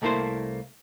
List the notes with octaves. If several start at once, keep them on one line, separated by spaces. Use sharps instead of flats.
C2 A3 A#3 E4 C5